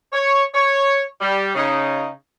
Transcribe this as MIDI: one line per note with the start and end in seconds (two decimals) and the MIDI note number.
0.13 0.43 73
0.54 1.02 73
1.21 1.51 55
1.55 2.10 49
1.55 2.10 63